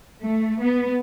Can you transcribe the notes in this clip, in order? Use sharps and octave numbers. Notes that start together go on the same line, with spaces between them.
A3
B3